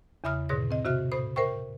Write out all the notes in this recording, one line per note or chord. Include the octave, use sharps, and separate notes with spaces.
E2 C#3 E5 B5 D#6 F6
G#2 B2 D3 G#4 C#5 A#6
C4 D#5
C3 F#4 E5 F6
A2 C5 B5 D#6
A#4 C5 E5 G5 C#6